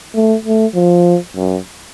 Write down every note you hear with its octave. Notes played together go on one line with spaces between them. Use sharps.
A3
A3
F3
F#2